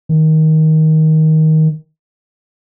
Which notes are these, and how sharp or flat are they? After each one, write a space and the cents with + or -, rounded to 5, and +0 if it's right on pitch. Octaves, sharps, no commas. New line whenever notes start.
D#3 +15